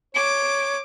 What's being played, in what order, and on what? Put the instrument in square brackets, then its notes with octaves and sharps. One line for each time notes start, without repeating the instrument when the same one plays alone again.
[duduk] C#5 [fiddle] D6